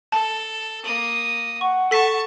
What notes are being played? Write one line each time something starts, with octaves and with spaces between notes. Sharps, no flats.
A4 A5
A#3 D#6
F#5 C#6
A4 A5 C#6 B6